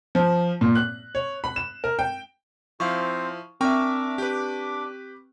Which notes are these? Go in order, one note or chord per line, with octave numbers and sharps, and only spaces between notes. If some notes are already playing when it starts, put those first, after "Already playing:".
F3
A#2
F#6
C#5
B5
E7
A#4
G5
F3 C4 E4 C5 F5 C#6
C4 D4 A#4 E5 G5 C#6 D6
G4 B4